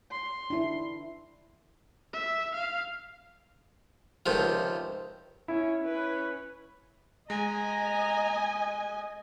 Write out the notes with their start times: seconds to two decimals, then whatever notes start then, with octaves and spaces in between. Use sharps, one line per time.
0.11 C6
0.50 D4 E4
2.13 E5
2.55 F5
4.26 C#2 C3 D#3 F3
5.48 C#4 E4
5.84 C#4 B4
7.30 G#3 D#5 G#5 A#5